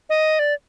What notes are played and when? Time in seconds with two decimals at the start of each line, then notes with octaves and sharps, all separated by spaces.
0.10 D#5
0.39 D5